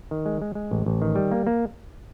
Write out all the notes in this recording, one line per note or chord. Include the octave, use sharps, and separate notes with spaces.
D#3
G#3
G#3
G#3
A1
A1
D#3
G3
A#3
A#3